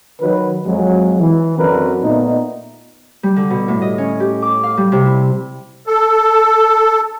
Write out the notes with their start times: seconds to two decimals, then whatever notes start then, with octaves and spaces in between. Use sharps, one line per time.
0.21 D#3 F#3 B4
0.65 F2 F#3 G#3
1.19 E3
1.57 F#2 D3 C4 F#4 A#4 B4
2.03 A#2 A3 B3 D#4
3.23 G3
3.36 D3
3.50 B2
3.68 A2
3.82 D#5
3.98 C#4
4.20 G4
4.42 D6
4.63 F5
4.77 G3
4.92 C3
5.05 E4
5.87 A4